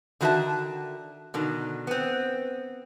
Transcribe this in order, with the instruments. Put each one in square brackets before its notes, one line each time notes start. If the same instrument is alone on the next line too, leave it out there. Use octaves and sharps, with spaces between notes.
[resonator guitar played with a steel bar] D3 D#3 F#4 C5 E5 A5
B2 D3 D#3
B3 C4